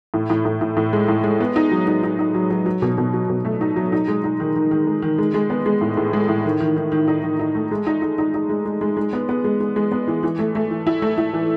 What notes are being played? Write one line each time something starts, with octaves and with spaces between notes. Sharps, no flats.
A2
A2
A2
A2
A2
G#3
A2
G#3
B3
D#4
F#3
D#4
D#4
D#4
F#3
F#3
F#3
B2
B2
F#3
B2
A3
D#4
F#3
D#4
G#3
D#4
D#3
D#3
D#3
G#3
D#3
G#3
G#3
B3
G#3
A2
A2
G#3
A2
D#3
D#3
D#3
D#3
D#4
D#3
D#4
A3
G#3
D#4
D#4
D#4
D#4
G#3
G#3
G#3
G#3
B3
B3
G#3
G#3
G#3
B3
E3
E3
A3
A3
E3
E4
A3
E4
E3